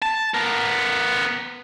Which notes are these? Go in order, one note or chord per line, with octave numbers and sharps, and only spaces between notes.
A5
B3 A#4